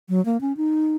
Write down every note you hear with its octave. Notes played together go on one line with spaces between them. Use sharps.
F#3
A#3
C#4
D#4